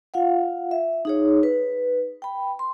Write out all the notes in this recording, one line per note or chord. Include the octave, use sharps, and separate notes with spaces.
F4 F5 F#5
E5
D#4 G#4 C#5
B4
G5 B5
C6